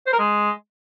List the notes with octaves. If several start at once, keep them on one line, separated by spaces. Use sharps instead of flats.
C5
A#4
G#3